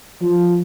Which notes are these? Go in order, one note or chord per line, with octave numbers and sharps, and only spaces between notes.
F3